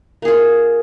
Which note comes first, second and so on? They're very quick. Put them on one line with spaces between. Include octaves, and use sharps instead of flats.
A#3 G#4 F4